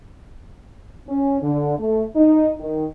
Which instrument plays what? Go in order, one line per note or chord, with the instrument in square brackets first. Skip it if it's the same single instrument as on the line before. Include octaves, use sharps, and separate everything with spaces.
[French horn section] C#4
D3
A3
D#4
D#3